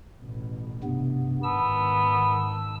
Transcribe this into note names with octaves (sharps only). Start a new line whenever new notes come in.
A1 B2
G2 C3 B3
G#2 D#3 B3 A5 E6